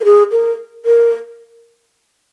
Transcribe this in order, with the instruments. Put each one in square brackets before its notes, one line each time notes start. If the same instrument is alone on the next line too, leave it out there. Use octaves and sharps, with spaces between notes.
[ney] A#4
G#4
A#4
A#4